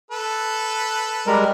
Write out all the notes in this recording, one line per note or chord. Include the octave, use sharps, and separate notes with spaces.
A4 B4
G3 G#3 A#4